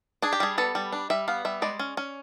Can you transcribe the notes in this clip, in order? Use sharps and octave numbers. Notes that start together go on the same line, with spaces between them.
D4 G#4
G4
G3 G#4
B3 A4
G3
D4
G3 E5
B3 F5
G3 E5
G#3 D5
C#4
C#4